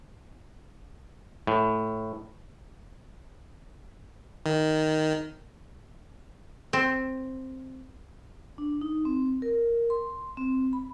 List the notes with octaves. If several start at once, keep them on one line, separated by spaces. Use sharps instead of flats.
A2
D#3
C4
D4
D#4
C4
A#4
C6
C4
B5